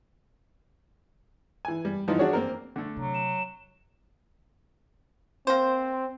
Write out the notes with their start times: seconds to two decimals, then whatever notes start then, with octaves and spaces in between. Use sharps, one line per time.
1.65 E3 G#5
1.85 G3
2.08 E3 F3 G3 B3 D#4 F4
2.19 D4 F#4 G#4 C#5
2.33 A#3 C4 A#4
2.76 D3 A3
2.97 C3 F#3
3.14 E7
5.47 A#3 C4 C5